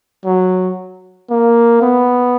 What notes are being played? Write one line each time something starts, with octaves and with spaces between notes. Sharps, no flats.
F#3
A#3
B3